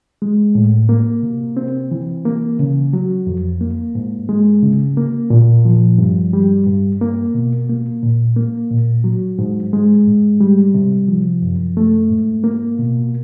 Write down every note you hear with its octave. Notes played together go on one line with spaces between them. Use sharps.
G#3
A2
A#3
C3
C4
E3
A#3
C#3
F#3
F2
A#3
G#2
G#3
C#3
A#3
A#2
F3
G2
G3
G2
A#3
B2
A#3
A#2
A#3
A#2
F#3
G#2
G#3
G#2
G3
C3
F3
F#2
A3
G#2
A#3
B2